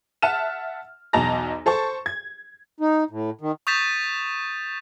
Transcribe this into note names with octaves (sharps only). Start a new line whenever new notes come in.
E5 F#5 A5 F6 E7
B1 E2 D#5 A5 A#5 A#6
A4 C5 A5 C#6
G#6
D#4
A2
D#3
C#6 D#6 G6 A6 B6 E7